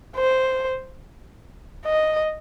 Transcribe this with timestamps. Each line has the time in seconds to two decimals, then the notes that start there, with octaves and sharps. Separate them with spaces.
0.16 C5
1.86 D#5